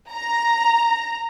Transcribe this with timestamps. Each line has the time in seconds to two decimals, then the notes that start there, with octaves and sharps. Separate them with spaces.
0.12 A#5